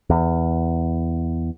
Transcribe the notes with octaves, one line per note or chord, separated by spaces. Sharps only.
E2